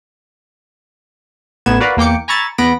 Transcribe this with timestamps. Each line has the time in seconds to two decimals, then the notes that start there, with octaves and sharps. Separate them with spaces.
1.66 A1 A2 B3 D#4 G#6 E7
1.80 F#4 A#4 B4 D5 F5
1.97 E2 A#3 G5 D6 C#7
2.28 G#5 A#5 B5 C#6 E6 A6
2.58 E2 B3 B5 A#6 D7